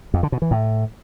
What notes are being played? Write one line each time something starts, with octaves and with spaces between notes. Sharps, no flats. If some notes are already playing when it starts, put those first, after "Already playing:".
F2
D3
B2
E3
A2